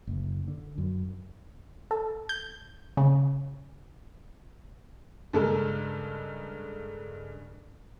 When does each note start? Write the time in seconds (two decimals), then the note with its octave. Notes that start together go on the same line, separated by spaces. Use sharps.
0.07 F#1
0.48 D3
0.78 F#2
1.91 A4
2.29 G6
2.97 C#3
5.33 G2 C#3 G#3 A4 A#4